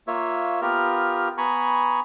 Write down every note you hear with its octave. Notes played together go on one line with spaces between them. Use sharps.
A#3 F4 C#5 E5
B3 F4 G4 A#4 F6
B3 G#5 A#5 B5 C#6